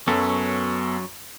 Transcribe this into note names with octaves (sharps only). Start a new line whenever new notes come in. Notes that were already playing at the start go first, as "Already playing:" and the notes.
F#2 F#3 B3 C#4 A4